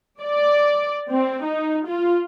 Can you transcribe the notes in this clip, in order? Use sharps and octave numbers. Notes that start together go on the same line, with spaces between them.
D5
C4
D#4
F4